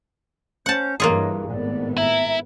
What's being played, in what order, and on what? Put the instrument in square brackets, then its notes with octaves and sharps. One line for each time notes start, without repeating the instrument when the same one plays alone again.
[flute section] C#4 C5 G6 [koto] F#5 A5
[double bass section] G2 E3 [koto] A#3 F4 G#4 [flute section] C#5 D#5
[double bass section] G#1 A2 B3 [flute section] D5
[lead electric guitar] E4 [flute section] E5 A#5